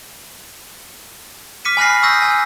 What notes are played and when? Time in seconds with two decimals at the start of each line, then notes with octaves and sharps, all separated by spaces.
1.65 D6 F6 B6 C#7 D#7
1.77 G#5 B5 F6 F#6 A#6 C7
2.03 C#6 D#6 E6 G6 A#6
2.22 G#5